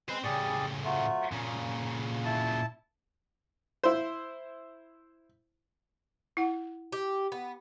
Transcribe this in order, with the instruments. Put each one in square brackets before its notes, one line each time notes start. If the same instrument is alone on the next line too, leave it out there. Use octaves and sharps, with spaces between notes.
[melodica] G#3 B4 [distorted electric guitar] C4 C5
[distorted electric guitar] A2 C#3 [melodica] G3 G#4 D5
[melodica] F#3 A3 F4
[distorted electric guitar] A#2 C#3 [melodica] A#4
[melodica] E4 A5
[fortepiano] E4 C5
[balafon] E4 F#5
[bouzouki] G4
B3